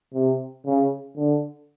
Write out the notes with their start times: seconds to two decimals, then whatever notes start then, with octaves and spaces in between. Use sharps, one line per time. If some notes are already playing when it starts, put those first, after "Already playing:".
0.14 C3
0.66 C#3
1.16 D3